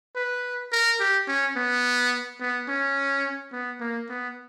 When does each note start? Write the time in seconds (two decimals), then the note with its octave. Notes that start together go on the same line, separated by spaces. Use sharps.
0.16 B4
0.72 A#4
1.00 G4
1.28 C#4
1.56 B3
2.41 B3
2.68 C#4
3.52 B3
3.80 A#3
4.09 B3